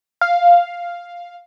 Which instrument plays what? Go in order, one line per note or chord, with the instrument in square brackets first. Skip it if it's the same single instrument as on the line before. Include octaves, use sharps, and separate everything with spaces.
[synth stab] F5